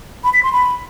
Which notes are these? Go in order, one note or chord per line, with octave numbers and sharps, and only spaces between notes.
B5
B6
C6
B5